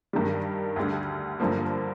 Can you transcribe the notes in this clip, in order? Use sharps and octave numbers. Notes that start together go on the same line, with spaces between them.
G2 D#3 G3
D2 D3 G3
G2 D3 F3 A#3